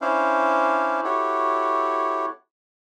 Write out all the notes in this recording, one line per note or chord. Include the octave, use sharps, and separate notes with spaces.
C#4 D4 E4 C5 F5
E4 F#4 G4 A4 C#5